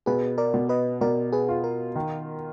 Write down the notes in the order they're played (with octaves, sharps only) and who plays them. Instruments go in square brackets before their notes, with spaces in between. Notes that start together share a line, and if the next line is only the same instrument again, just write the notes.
[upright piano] B2 [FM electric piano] G#4 B4
[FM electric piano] A#4 D5
[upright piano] B2
[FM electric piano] B4 D#5
[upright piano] B2 [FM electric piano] A#4 D5
[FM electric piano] G#4 B4
[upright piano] F4
[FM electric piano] A#4
[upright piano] D#3